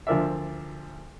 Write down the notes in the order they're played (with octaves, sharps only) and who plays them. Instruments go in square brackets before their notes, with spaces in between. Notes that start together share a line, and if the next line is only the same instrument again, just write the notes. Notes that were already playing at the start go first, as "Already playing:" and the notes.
[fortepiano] D2 F3 A#4 D5 E5